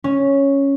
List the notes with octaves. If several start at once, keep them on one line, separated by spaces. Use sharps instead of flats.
C#4